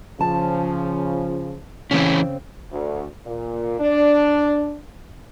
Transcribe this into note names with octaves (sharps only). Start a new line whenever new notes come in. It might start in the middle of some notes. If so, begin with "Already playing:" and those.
C#3 F3 A5
C#3 E3 C4 C#4
D2
A#2
D4